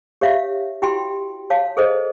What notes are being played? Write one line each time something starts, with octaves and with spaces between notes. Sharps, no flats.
G4 C#5 E5 F5
E4 F#4 G4 G5 B5 C6
C#5 F5 A5
G#4 A4 C5 D#5